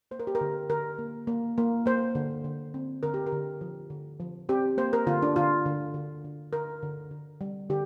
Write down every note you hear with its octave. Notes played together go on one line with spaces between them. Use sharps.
A#3 C5
A#4
G4
A#4
D3
D3 A#4
A#3
A#3
A#3
A#3 C5
D3
D3
C4
D3 A#4
G4
A#4
D3
F3
D3
F3
C4 G4
A#3 C5
A#4
D3 F4
D4
D3 F4
D3
D3
D3
D3 A#4
D3
D3
G3
D3 G4